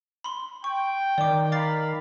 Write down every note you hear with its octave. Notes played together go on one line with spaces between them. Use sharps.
B5 C6
G5 C#6
D#3 D5 D6
F5 A#5 B5 D6 A6 C7